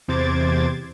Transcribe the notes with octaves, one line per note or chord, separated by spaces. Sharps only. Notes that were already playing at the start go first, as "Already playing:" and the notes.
E2 C3 C5 D6 G#6 A6